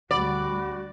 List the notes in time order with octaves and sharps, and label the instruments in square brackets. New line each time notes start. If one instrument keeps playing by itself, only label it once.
[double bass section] D2 G3 [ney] F#4 [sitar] D5 [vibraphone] F#5 B5 D6